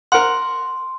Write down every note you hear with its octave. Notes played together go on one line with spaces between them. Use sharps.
A#4 F#5 C6